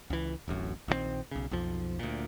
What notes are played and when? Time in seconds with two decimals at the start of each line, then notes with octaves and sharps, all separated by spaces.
0.10 C#2 E3
0.48 D1 A1 F#2
0.88 A#1 D#3 F3 C4
1.31 B1 C#3
1.51 B1 F2 F3
1.99 D2 A#2